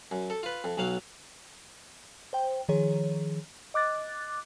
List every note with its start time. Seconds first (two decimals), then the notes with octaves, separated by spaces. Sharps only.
0.11 F#2
0.30 A4
0.43 F4 B4
0.64 F2
0.77 B1 F#3 F5
2.33 C5 G5
2.69 D#3 F3 G#4 C#5
3.74 D#5 D6 F#6 A6